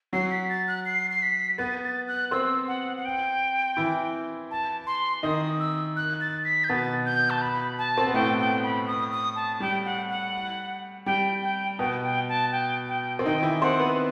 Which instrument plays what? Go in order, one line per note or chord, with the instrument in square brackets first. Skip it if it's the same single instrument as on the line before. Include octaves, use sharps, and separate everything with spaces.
[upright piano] F#3 F#4 [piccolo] C7
[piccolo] B6
A6
F#6
C7
C7
B6
[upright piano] B3 B4 [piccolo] A6
[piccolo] A6
F#6
[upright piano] C4 C5 [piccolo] E6
[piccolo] F#5
F#5
G5
[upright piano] E3 E4
[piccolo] A5
C6
[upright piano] D#3 D#4 [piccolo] D#6
[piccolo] E6
F#6
A6
B6
G6
[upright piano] B2 B3 [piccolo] A6
[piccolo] G6
A5
B5
A5
[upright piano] C4
B3
[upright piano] A2 A3 [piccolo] G5
[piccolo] G5
B5
D#6
D#6
A5
[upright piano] G3 [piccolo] G5
[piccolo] F#5
F#5
[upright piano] G3 [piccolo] G5
[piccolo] G5
[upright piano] B2 B3 [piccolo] G5
[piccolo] G5
A5
G5
G5
[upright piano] C4
[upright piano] D#3 D#4 [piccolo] G5
[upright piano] E3 E4
[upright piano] C4 C5 [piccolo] F#5
[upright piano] B3 B4